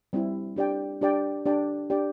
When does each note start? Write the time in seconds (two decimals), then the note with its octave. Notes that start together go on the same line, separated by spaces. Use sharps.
0.13 G3 C4 E4
0.56 D4 G4 D5 G5
1.01 D4 G4 D5 G5
1.46 D4 G4 D5 G5
1.90 D4 G4 D5 G5